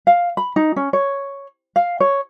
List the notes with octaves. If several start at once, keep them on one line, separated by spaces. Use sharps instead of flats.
F5
B5
D#4
C#4
C#5
F5
C#5